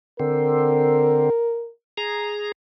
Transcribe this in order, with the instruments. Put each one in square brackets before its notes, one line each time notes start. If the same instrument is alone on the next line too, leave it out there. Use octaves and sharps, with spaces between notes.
[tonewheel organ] D3 C4 [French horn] A#4
[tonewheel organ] G#4 A#5